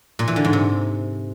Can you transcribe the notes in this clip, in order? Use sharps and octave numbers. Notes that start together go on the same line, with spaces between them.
A#2
E3
D3
G#2
C3